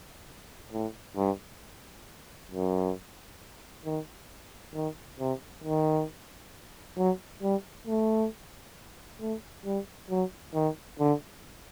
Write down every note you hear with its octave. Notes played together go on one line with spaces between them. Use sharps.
A2
G2
F#2
D#3
D#3
C3
D#3
F#3
G3
A3
A3
G3
F#3
D#3
D3